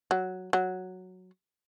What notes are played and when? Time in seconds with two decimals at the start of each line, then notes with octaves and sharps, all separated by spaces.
0.11 F#3
0.53 F#3